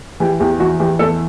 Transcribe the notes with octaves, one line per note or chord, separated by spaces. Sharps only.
E3 G4
E2 G4
E3 F#4
E3 G4
E2 A4